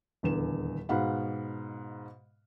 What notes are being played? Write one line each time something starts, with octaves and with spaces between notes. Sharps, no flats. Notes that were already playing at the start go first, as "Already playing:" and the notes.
D#1 E2 D3 E7
G#2 B2 F5 F#5 B5